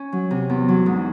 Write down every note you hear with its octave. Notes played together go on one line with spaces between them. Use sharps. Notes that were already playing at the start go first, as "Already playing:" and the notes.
Already playing: C#4
F#3
C3
E2
F#3
G#2